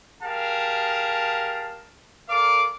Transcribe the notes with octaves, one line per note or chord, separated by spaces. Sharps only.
G4 G#4 A#4 F5 A5
A4 A#4 D5 F5 D6